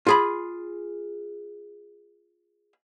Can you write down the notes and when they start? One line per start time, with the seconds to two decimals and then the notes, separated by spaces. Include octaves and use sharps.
0.07 F4 G#4 B5